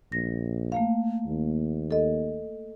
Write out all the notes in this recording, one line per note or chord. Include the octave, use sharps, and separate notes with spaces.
A#1 A#6
A3 A#3 F5
D#2
A4 D#5